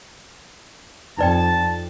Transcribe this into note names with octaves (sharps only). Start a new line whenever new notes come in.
F2 D#4 D5 G5 A5